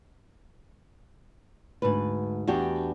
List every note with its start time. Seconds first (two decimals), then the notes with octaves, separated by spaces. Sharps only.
1.82 D2 G#2 B4
2.47 E2 D4 F#4 G4